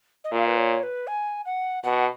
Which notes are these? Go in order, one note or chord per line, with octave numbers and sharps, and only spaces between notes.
D#5
A#2 F5
B4
C#5
B4
G#5
F#5
B2 F#5